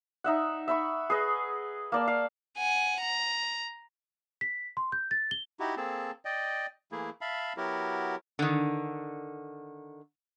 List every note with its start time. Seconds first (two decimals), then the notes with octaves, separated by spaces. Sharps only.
0.24 D#4 E5 F#5
0.68 E5 B5 C#6
1.10 G#4 B4 D#5
1.92 A#3 D5 A5
2.08 F5
2.57 F#5 G#5
3.01 A#5
4.41 B6
4.77 C6
4.92 G6
5.11 A6
5.31 G7
5.60 D#4 E4 F#4 G4
5.77 A#3 C4 G#4 A4 A5
6.25 D5 D#5 G5
6.92 E3 A3 A#3 E4 G#4
7.21 E5 F5 A5 B5
7.57 F#3 B3 E4 F#4 G4 A#4
8.39 D3 D#3